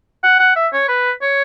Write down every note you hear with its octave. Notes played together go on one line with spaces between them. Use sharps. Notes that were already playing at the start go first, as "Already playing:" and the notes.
F#5
F#5
E5
C#5
B4
C#5